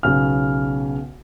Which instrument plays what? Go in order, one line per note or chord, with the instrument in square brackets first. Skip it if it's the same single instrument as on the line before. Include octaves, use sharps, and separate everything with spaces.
[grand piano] B1 C#3 F6